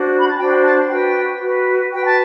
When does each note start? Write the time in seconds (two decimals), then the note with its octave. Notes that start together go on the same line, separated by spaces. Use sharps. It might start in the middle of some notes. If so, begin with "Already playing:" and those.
Already playing: D4 F#4 C5
0.19 B5
0.28 A5
0.37 D4 F#4 C5 G5
0.63 A5
0.88 F#4 B4 G5
1.40 F#4 B4
1.91 F#4 B4 G5
2.03 A5